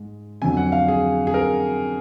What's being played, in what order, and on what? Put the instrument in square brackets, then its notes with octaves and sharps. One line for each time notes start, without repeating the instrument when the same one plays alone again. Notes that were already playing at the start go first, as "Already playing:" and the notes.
Already playing: [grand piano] G#2 G#3
F2 D3 F#3 G#5
F#5
F5
G#4
G#4
A#4